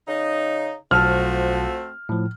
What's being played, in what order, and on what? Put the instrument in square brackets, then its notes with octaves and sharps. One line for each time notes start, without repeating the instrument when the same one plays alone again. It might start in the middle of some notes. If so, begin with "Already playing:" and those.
[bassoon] C#3 [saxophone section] D#4
[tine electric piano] B1 A5 [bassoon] F3 [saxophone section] A3 C4 F#4 [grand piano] F6
[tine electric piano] A2 F3